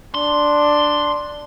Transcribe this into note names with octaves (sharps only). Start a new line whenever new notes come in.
D4 C6